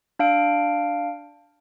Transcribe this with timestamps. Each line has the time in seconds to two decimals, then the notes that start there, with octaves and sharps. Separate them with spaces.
0.19 D4 F5 D7